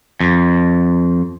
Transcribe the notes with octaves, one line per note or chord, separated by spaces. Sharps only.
F2